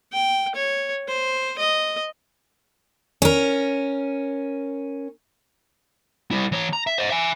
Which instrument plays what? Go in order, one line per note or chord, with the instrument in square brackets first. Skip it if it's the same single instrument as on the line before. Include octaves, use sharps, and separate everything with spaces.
[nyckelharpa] G5
C#5
C5
D#5
[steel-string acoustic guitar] C#4 A#4
[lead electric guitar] G3 E4
E3 C#5
A#5
E5
C5 D#5
E5 G#5